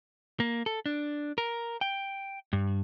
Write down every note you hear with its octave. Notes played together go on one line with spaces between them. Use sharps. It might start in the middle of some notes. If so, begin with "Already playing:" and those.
A#3
A4
D4
A#4
G5
G2